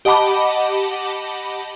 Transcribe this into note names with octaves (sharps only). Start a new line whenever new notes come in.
G4 D#5 F#5 A5 B5 D6